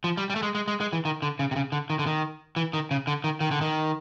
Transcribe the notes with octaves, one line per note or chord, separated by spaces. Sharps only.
F3
G3
G3
A3
G#3
G#3
G#3
G#3
E3
D#3
D3
C#3
C3
C#3
D3
D#3
D3
D#3
E3
D#3
C#3
D3
D#3
D#3
D3
D#3